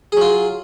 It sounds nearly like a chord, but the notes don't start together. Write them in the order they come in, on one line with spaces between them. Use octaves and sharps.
G#4 F#3 F4